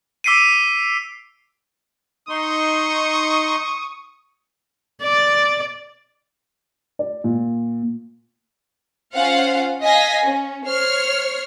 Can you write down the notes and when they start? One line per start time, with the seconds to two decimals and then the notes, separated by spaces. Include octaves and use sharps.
0.24 D6 E6 B6 C7 D7 D#7
2.29 D#4 C6 C#6 D#6
5.02 D5
6.99 D5
7.24 A#2
9.14 C#4 F4 C5 F5 F#5
9.83 D#5 F5 G#5 A#6 B6
10.25 C#4
10.66 C5 C#5 F6 C7